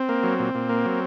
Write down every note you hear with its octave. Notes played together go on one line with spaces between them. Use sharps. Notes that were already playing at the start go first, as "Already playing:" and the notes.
Already playing: C4
A#3
F#3
A#2
A#2
A#3
F#3